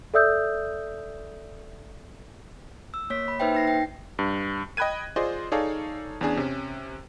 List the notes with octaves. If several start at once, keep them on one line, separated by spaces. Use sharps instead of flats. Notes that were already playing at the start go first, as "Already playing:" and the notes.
A4 D5 E5 D#6 E6 G6
E6
A#3 C#5 B6
B5
A#3 D#4 B4 C5 E5 G5
D#4 A#6 C7
G5
G2
D#5 G5 B5 F#6 G#6 D#7
F4 G#4 C5 D5 D#5 C6
D#4 G#4 A4 C#5 D5 F5
E2 C#4 D4 G#4
C3 C#4